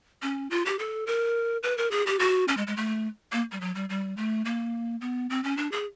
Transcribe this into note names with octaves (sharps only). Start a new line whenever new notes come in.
C#4
F4
G4
A4
A#4
B4
A#4
G#4
G4
F#4
C#4
G#3
G#3
A3
A#3
G3
F#3
G3
G3
A3
A#3
B3
C4
C#4
D4
G#4